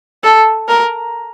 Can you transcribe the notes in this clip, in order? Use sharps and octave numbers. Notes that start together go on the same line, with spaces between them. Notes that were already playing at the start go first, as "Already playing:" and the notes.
A4
A#4